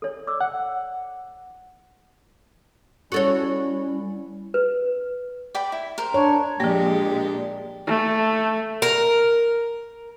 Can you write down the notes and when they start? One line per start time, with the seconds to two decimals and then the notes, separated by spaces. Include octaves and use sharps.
0.02 A4 C#5
0.27 D5 D6 E6
0.41 F#5
3.12 G3 C#4 E4 F#4 A4 C#5
4.54 B4
5.55 D5 G5 B5
5.72 E4
5.98 A#4 C5
6.14 D4 C#5
6.60 A#2 F3 G#3 A#3 D4 G4
7.87 A3
8.82 A#4